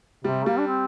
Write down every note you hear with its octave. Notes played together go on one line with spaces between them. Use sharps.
C3 G3
G3 A#3
D4
C4